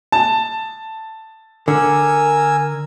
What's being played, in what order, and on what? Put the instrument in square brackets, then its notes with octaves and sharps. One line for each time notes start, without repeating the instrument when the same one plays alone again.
[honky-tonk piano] A5
[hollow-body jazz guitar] D3 [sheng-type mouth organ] A#4 G#5 E6